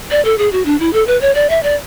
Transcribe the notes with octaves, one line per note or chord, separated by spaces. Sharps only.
D5
A4
G#4
F#4
D4
E4
A4
B4
C#5
D5
E5
D5